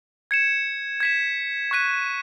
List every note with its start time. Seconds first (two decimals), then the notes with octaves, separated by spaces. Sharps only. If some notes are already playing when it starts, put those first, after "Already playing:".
0.31 G#6 C#7 E7
1.00 G#6 B6 E7
1.71 C#6 F#6 B6 D#7